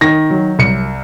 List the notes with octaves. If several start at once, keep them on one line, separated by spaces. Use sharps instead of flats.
D#3 A#6
F#3
C2 C#7